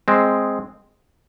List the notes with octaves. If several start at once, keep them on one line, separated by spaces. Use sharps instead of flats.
G#3 C4